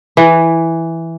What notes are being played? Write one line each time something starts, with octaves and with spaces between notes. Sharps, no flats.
E3